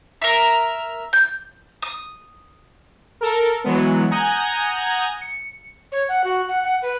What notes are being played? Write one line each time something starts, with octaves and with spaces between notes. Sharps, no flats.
A#4 E5
G6
D#6
A4 A#4
E3 F#3 G#3 B3
F#5 G#5 A#5 D#6 G6 G#6
C#7
C#5
F#5
F#4
F#5
F#5
B4